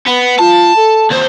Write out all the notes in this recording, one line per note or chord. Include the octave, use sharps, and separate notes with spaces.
B3
F4 A5
A4
D#2 C5